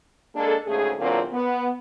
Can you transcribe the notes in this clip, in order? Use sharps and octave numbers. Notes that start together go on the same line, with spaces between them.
G#3 A#3 D4 G#4 A4
D2 G#2 C#3 A3 G#4
E2 A#2 D3 F#3 A#3 C4
B3